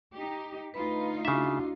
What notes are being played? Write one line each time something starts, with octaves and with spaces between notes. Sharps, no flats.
D#4 G4
D2 D#4 F4 B4 B5
C#3 D4 E4 F#4 E5